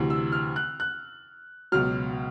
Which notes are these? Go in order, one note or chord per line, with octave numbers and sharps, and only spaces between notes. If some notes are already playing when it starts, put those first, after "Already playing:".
Already playing: D2 C3 E3
E6
F6
F#6
F#6
C#2 B2 F#3 F6